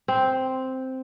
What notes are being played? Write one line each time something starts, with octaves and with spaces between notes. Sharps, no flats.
C4